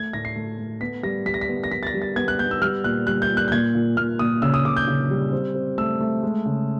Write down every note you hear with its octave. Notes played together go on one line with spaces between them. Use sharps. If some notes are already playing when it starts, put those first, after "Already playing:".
Already playing: A3 G#6
A2 A#6
C7
A3
A3
B3 B6
G3 A#6
G3 B6
A#6
B6
B3
A#6
G3 B6
A6
A#6
G3
A6
B3 G#6
F#6
B3 G6
E6
G3 F6
A#2 F#6
G3 F#6
G6
A#2
F#6
G6
A#2 G#6
A#2
A#2 F6
A#2 D#6
C#3 E6
D#6
C#3 D6
G6
C#3
G3
C4
C4
A3 E6
A3
G#3
C#3